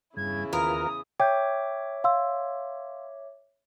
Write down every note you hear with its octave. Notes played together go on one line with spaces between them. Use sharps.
E2 G2 C#3 E4 G#6
D#2 F4 A#4 B4 D#6
C#5 E5 G5 D6 G6
F5 C6 E6